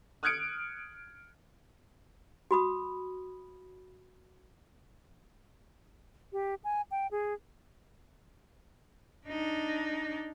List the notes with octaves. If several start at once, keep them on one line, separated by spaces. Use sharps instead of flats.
D#6 F6 F#6 G#6 C#7 D7
F#4 B5 D#6
G4
G#5
G5
G#4
D4 D#4